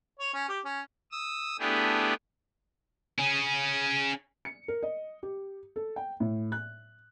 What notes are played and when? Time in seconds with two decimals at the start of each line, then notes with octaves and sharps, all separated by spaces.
0.19 C#5
0.34 C#4
0.49 G4
0.65 C#4
1.12 D#6 E6
1.59 A3 B3 D4 E4 G4 G#4
3.19 C#4 G#4
4.45 C#7
4.68 A#4
4.83 D#5
5.23 G4
5.76 A4
5.96 G5
6.20 A2
6.52 F#6